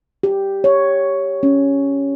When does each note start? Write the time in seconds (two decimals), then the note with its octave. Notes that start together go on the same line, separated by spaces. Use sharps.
0.23 G4
0.64 C#5
1.43 C#4